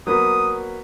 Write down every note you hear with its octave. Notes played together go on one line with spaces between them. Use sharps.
F#3 A#3 B3 D#6